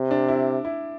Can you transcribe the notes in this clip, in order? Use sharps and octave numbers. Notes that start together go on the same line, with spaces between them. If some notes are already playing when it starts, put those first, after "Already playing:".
Already playing: C3
D4
E4
E4